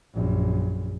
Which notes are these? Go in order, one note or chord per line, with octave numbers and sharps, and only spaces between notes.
A#1 F#2